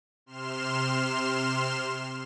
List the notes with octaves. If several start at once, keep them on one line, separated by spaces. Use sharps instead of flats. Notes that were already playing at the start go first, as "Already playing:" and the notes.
C3 C6 F6 E7